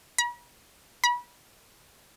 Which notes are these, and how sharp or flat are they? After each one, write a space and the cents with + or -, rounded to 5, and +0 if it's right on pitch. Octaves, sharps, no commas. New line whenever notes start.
B5 -45
B5 -30